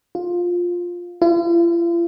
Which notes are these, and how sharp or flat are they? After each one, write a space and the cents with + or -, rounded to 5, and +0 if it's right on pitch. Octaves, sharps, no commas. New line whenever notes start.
F4 +10
F4 -45